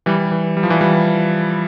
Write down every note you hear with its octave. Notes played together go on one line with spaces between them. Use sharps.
E3 G3
E3
G3
F3
E3 G3
E3 G3